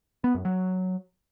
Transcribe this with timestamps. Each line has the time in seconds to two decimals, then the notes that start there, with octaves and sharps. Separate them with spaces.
0.24 B3
0.35 F#2
0.45 F#3